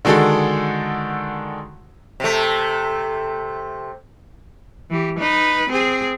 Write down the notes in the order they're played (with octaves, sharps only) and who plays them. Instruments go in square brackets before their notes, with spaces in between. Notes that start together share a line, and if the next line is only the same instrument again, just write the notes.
[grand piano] D3 D#3 G#3 F#4 A4
[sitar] C3 A3
[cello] E3 G4
D#4 B4
C4 G#4